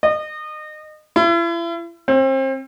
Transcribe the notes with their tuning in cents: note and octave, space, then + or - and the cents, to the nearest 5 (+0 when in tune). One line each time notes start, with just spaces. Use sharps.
D#5 -30
E4 +40
C4 +35